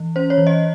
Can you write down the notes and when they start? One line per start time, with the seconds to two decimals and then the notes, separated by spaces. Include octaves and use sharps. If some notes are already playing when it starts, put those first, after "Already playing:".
Already playing: E3
0.16 C#4 C5
0.30 C#5
0.38 E3
0.47 D#5